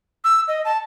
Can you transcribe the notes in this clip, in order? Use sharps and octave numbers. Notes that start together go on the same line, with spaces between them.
E6
D#5
A5